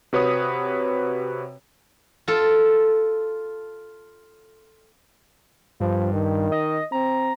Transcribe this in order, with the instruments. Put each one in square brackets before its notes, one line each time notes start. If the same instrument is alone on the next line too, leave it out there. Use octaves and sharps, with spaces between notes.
[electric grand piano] C3 F#4 B4 C#5 B5 D#6
[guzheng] F4 A4
[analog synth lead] G2 [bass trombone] F3
[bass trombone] D#3
[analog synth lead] D#5
[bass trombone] C4 [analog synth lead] A#5